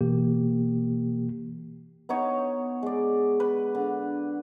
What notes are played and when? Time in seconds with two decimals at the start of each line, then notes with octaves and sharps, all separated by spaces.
0.01 B2 E3 A#3 G4
2.09 B3 D#4 C#5
2.83 G#3 D5
3.40 B4
3.75 D3